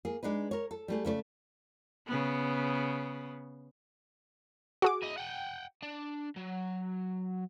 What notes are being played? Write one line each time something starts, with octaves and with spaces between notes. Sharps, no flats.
A#3 G#4
G#3 D4 D#4 B4
A#4 C#5
A4
G3 A3 G#4
C#3 A3 C5 D5
C#3 B3
F#4 G#4 D6
E4 D#5
F#5 G5
D4
F#3